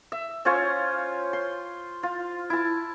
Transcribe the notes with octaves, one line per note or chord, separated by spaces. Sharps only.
E5
C#4 F4 C5 C#5
C6
F4
E4 A5